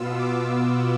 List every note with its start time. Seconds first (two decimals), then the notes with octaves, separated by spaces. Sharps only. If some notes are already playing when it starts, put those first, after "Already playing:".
Already playing: B2 B3 F4 E6
0.19 D6